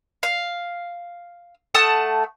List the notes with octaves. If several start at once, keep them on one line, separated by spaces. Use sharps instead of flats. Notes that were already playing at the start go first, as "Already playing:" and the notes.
F5
A3 F#5 A5 D#6